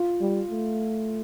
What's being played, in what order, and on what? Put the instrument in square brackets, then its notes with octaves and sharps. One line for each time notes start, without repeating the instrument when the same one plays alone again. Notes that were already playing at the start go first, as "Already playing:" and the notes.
Already playing: [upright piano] F4
[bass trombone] G3
A3